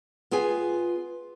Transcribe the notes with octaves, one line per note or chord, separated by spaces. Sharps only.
B3 F4 G#4 G#5